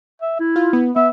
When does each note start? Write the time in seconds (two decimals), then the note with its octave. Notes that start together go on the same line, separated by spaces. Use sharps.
0.21 E5
0.39 E4
0.56 F4
0.73 B3
0.96 B3 E5